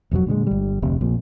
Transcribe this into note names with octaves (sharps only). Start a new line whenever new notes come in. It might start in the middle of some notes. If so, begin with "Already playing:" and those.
E1 F2 E3 F#3
A#2 D3 F3 G#3
G1 G3
F1 D2 C3
A#1 A#2